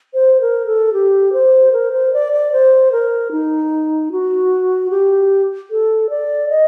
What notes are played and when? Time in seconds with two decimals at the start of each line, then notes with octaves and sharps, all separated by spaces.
0.14 C5
0.41 A#4
0.66 A4
0.93 G4
1.33 C5
1.72 A#4
1.92 C5
2.13 D5
2.32 D5
2.52 C5
2.92 A#4
3.32 D#4
4.12 F#4
4.90 G4
5.71 A4
6.10 D5
6.49 D#5